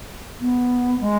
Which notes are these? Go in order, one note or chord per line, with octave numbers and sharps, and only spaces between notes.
B3
G#3